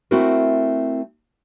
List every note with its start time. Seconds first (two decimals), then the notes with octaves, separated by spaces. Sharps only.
0.11 A3 C4 E4 F#4 A#4